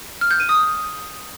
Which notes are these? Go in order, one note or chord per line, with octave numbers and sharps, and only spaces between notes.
F6
G6
D#7
D#6